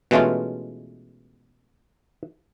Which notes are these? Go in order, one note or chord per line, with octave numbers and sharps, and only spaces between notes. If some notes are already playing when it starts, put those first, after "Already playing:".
B2 E3 G#3 A3 C#4 F4